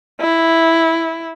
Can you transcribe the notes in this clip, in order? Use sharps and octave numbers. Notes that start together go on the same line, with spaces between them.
E4